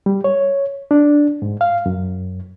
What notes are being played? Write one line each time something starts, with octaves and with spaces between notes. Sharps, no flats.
G3
C#5
D4
G#2
F5
F#2